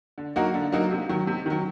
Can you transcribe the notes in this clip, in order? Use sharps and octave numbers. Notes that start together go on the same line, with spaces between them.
D3
F#3 A#3 D#4 F#4
D3
F#3 A#3 D#4 F#4
C3
D#3 F#3
C3
D#3 F#3